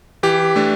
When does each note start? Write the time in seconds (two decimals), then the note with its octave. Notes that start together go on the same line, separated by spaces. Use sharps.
0.23 E3 G4
0.56 A3 D4